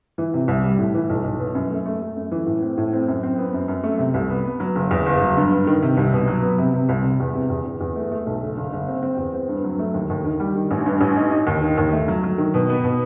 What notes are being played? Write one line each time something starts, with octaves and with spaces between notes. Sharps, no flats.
E3
C3
C2
G3
A2
E3
B1
B1
B2
F#2
A3
A3
A3
F#2
E3
A2
C4
A2
C4
F#2
C4
B3
F#2
F#2
A3
C3
C2
B3
B3
F#3
F#1
E2
F#1
F#3
G2
G2
D#3
C3
C2
B2
F#3
B3
C3
C3
C2
C3
E2
C3
E2
E2
E2
A3
A3
B1
F#1
F#1
F#1
C4
C4
E2
C4
G2
F#3
A3
D#2
D#2
D#3
G3
D#3
A1
G2
A1
D#4
D#4
D#2
D#3
D#2
A3
F#3
F#3
D#3
B2
B3
B2